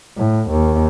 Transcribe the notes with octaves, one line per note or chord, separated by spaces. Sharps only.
A2
D#2